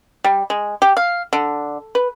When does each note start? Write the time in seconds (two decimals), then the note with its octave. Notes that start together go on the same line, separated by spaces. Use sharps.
0.24 G3
0.50 G#3
0.82 G4
0.97 F5
1.33 D3
1.95 B4